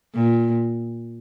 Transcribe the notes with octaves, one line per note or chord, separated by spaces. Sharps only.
A#2